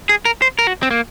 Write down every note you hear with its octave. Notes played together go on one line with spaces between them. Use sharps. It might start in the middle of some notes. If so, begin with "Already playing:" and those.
G#4
A#4
C5
A#4
F#4
C4
A#3